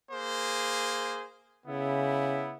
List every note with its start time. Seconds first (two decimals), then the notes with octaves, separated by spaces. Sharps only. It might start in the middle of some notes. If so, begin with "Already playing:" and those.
0.12 A#3 G#4 C5
1.67 C#3 B3 E4